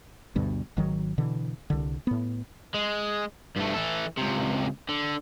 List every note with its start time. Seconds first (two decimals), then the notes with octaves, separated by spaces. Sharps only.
0.36 D2 G2 B2
0.77 G#1 D#3 F#3
1.18 B2 D3 E3
1.70 C2 D3
2.07 A2 B3
2.74 G#3
3.56 G2 A3
3.74 E3 A4
4.17 C#2 C3
4.89 D3